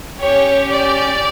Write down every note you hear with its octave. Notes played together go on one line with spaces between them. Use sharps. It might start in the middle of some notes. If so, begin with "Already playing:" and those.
C#4 G4 C#5
D5